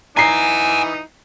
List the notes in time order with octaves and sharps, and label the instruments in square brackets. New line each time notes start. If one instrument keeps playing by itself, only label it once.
[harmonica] E3 D#4 D#6 [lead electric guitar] F#5 G#5 [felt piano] A#5 C7